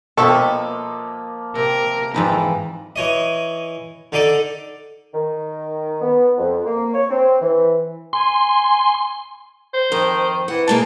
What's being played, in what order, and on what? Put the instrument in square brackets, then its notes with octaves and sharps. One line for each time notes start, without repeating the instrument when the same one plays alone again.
[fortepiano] B2 A4 C#6 [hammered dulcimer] F3 A#3 [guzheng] E5 G5 A5
[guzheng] C3 [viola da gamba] A#4
[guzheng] F2 G#2 B4 [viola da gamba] E3 [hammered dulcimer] A#5
[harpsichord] E3 C#5 D#5
D3 D#4 A4 D5
[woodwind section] D#3
B3
F2
A#3
C#5
C4
E3
[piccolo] G#5 [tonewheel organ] C6
[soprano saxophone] C5
[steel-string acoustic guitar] F2 [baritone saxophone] D#3
[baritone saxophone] E3 [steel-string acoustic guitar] F#5
[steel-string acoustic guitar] B2 G#3 A#3 [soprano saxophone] A5